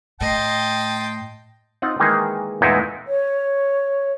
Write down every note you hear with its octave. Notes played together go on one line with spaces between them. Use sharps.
A2 D#5 G5 A5 C6
C4 D#4 F4 F#5
D#3 E3 G#3 A#3 D#4 G#4
E2 A#2 G#3 A3 D#4 E4
C#5